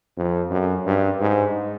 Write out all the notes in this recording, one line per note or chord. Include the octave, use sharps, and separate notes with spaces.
F2
F#2
G2
G#2